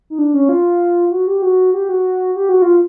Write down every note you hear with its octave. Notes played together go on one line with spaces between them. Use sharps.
D#4
D4
C#4
F4
F#4
G4
F#4
G4
F#4
G4
F#4
F4